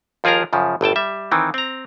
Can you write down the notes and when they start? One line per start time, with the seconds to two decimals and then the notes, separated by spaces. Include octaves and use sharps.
0.24 D#2 F3 F4 G#4 A#4 A#5
0.53 F#2 C#3 F3
0.81 G1 A2 G5 A5
0.96 G3 E5
1.31 D#3 E3 C4
1.54 C4 A#5